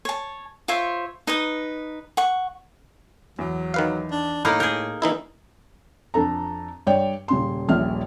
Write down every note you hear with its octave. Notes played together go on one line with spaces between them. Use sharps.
C#5 A5
F4 C5 C#5 E5
D#4 B4 D#6
F#5 C#6
E2 F#3
D#3 B4 F5
D4
A2 A#3 D#4 A#4 B5
G#4 A#4 G6
E3 A#3 D#4 E4
F2 D4 A4 A#5
G2 C#5 D5 G5
D#1 C#3 C6
D#1 A#1 C#4 E5 F6